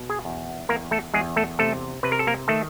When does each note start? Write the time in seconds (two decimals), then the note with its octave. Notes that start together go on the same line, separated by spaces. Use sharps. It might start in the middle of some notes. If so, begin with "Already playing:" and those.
Already playing: B2
0.09 G#4 G#5
0.25 E2
0.69 E2 A#3 A#4
0.91 A3 A4
1.14 E2 G#3 G#4
1.36 A3 A4
1.59 C3 A3 A4
2.03 C3 B4
2.12 A#4
2.19 A4
2.27 A#3 A#4
2.48 D#3 A3 A4